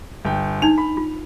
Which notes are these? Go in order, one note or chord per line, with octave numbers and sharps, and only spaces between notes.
G1 G5
D4 D#4 F7
B5
F4